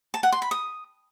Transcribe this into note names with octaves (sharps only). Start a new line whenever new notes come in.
A5
F#5
C6
B5
D#6